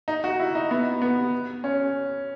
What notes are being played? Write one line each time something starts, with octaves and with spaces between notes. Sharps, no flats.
D#4
F#4
E4
D#4
B3
B3
C#4